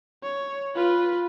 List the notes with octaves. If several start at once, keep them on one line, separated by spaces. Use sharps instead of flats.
C#5
F4 B4